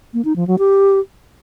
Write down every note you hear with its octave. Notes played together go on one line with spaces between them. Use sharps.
A#3
D#4
F3
F#3
G4